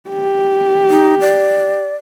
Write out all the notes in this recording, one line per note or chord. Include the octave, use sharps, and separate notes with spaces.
G4
D#4
D5